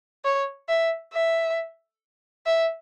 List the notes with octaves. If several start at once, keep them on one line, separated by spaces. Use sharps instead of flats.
C#5
E5
E5
E5